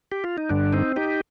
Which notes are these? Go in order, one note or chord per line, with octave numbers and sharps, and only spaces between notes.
G4
F4
D#4
G2 D3 D4
C4 D#4
D#4 G4